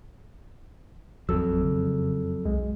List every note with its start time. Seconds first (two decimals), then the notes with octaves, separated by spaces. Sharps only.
1.29 A1 F2 F#3 A4 E6
1.61 C#3
2.45 B1 G#3